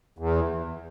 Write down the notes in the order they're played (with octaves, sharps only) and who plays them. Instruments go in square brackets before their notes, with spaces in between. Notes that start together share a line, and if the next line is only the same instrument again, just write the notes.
[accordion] E2